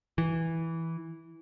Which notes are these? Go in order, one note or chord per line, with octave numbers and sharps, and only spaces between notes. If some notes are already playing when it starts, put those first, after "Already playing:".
E3